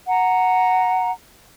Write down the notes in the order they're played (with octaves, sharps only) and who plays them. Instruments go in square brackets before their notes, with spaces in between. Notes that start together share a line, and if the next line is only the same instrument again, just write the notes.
[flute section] F#5 A#5